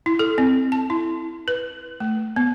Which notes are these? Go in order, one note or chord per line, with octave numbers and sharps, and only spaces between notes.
E4
A4
C4
A5
E4
B4
A3
B3